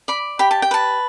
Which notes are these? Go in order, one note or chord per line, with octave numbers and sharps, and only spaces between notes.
D5 B5
G4 B5
A5
G5
B4 A5